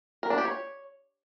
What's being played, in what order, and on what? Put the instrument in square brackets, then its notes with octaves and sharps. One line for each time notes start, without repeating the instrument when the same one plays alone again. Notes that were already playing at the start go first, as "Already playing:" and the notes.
[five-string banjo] A#4
D4
G4
C#5